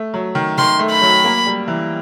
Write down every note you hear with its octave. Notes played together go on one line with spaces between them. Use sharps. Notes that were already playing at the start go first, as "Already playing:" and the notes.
Already playing: A3
F#3
D#3
D#3 C6
A3
B5
F#3
A#3
G3
E3